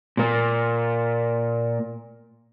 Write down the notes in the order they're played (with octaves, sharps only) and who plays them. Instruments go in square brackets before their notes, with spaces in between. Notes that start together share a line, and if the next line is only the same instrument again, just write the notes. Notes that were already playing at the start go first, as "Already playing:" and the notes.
[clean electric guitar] A#2 A#3